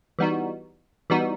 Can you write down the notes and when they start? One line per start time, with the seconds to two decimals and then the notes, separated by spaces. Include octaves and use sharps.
0.19 E3 G3 B3 D#4 F#4
1.10 E3 G3 B3 D#4 F#4